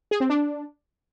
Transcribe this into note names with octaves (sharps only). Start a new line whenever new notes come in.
G#4
C4
D4